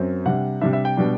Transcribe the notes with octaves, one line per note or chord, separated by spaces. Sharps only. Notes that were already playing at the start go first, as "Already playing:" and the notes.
Already playing: F#2 F#3 C4
C3 G3 D4 F#5
C3 G3 D4 E5
E5
G5
B2 G3 D4